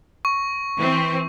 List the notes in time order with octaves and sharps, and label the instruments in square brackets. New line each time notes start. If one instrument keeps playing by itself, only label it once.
[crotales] C#6
[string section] E3 C4